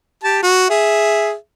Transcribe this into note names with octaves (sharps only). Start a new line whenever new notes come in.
G4 A5
F#4
G#4 E5